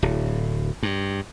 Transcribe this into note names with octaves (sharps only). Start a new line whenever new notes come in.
D1
G2